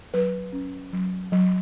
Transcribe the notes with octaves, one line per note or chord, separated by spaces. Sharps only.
F#3 B4
C#4
F#3
F#3